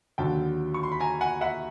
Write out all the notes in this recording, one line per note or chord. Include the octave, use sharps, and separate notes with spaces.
D#2 D3 F#3 G5 A5
C#6
C6
B5
G#5 A#5
F#5 G#5
E5 F#5